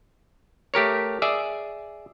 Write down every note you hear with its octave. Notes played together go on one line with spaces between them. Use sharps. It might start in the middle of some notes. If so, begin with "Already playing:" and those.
A3 G4 A#4 C#5
G#4 D5 E5